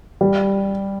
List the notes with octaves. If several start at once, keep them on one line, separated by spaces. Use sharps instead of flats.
G3